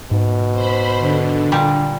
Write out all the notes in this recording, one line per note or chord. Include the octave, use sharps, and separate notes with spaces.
G#2 B2
C5 B5
D3
A#2 G3 G4